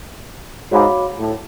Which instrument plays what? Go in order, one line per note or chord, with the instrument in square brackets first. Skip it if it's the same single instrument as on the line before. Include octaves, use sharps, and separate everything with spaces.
[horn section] G#2 [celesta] F#4 C#5 F5 B5 D6
[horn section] A2